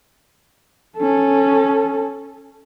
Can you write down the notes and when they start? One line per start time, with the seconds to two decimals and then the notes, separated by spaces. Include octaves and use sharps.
0.98 C#4 A4